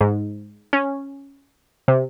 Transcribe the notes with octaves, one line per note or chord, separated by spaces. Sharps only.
G#2
C#4
C3